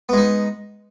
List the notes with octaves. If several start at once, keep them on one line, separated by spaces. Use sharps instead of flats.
G#3 B3 D#4